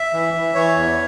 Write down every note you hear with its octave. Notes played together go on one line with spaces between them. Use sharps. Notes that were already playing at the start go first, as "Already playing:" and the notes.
Already playing: E5
E3
E3
E3 C#5
E2